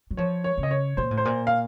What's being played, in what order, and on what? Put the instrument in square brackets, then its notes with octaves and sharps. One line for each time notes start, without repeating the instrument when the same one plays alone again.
[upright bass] F#3
[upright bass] F3 [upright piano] C#5
[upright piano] C#5
[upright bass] C#3
[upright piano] D#5
C#5
[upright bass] A#2 [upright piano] C5
[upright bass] A2
[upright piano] C5
[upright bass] A#2
[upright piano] F5